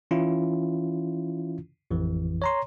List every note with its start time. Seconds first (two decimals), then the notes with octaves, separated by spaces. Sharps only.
0.11 E3 C#4 E4 F4
1.91 A1 F2 E3
2.42 C#5 A#5 C6